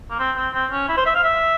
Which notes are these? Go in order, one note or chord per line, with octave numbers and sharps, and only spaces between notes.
A#3
C4
C4
C4
C#4
E4
C5
E5
F5
E5